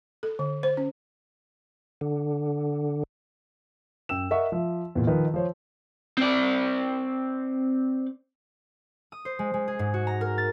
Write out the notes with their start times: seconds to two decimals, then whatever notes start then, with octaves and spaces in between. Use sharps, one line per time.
0.23 A4
0.39 D3
0.63 C5
0.77 C#4
2.01 D3
4.09 F#2 G5 E6 E7
4.31 A#4 D#5 E5 F#5 C#6
4.52 F3 E5
4.95 E2 A#2
5.07 D#3 F3 B4 D#5
5.34 F3 C5 C#5
6.17 C4 D5
9.12 D#6
9.25 C5
9.39 G#3
9.54 G#3
9.68 G#4
9.79 G#2
9.94 F#4
10.07 A#5
10.21 A#4
10.38 A6